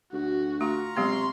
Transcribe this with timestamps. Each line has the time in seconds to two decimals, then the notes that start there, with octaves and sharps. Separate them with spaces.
0.13 D2 F#4
0.61 A3 F4 A#5 C#6
0.97 C3 F#3 G#3 B3 C6